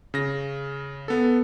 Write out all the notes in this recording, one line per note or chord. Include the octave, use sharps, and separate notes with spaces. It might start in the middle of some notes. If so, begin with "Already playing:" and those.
C#3 A#6
B3 A4